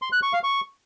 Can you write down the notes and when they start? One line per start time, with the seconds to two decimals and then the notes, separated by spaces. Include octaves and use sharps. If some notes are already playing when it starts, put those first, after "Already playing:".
0.02 C6
0.12 F#6
0.23 C#6
0.33 F5
0.43 C#6